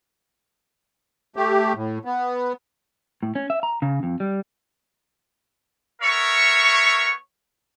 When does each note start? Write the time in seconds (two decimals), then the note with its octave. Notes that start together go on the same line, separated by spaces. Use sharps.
1.36 A3 G4
1.76 A2
2.05 B3
3.23 A2
3.35 C#4
3.50 E5
3.63 A#5
3.82 C#3
4.03 F2
4.20 G3
6.02 B3 A#4 C#5 E5 C#6